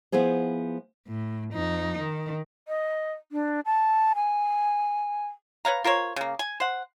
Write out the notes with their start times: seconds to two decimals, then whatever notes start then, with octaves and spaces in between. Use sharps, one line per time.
0.12 F3 B3 E4 G#4 C5
1.08 A2
1.54 F2 D#4
1.99 D#3
2.68 D#5
3.32 D4
3.66 A5
4.15 G#5
5.65 B4 C#5 F5 A#5
5.84 F4 A#4 C5 C#5
6.16 C#3 A#3
6.39 G#5
6.60 C5 F#5